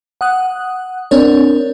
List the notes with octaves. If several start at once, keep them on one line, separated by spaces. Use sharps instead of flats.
F#5 D#6 F#6
C4 D4 A#4 C#5